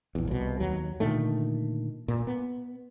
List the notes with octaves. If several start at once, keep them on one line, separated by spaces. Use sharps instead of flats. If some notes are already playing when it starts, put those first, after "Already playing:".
A#1 E2
C2 B2
D#2 F#3
A#2 D3 D#3 A3
A#2
B3